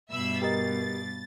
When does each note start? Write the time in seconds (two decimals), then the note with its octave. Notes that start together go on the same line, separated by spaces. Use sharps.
0.11 G2 B2 E5 B5 E6
0.42 G4 A#4 D#5 A6